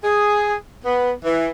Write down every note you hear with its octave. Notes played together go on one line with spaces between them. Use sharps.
G#4
B3
E3